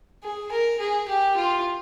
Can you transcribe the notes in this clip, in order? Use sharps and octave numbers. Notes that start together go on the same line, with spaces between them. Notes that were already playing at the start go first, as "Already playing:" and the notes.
G#4
A#4
G#4
G4
F4